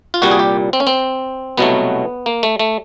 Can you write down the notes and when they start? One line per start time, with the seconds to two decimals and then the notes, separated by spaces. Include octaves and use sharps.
0.14 F4
0.22 C2 A#2 G3 F#4
0.31 G#4
0.39 G4
0.73 C4
0.80 C#4
0.87 C4
1.57 C2 B2 F#3 A3 B3
2.26 A#3
2.43 A3
2.59 A3